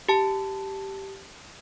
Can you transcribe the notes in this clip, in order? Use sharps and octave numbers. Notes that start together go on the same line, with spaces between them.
G4 A5